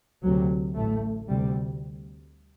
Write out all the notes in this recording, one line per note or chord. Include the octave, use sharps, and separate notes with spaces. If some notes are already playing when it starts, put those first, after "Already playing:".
D2 C3 F#3
A1 A2 A3
D2 C3 G3